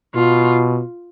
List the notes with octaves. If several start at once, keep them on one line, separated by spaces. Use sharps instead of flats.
B2 F4